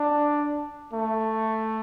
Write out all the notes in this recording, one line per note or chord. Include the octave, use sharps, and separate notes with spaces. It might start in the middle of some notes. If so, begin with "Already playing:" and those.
Already playing: D4
A3